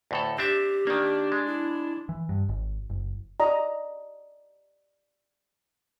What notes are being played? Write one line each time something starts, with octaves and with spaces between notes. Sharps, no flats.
D2 A2 A4
C4 D4 G4 E5
D#3 A#3 D4
G#3
E4
E3
G2
G#1
F#1
D5 D#5 A#5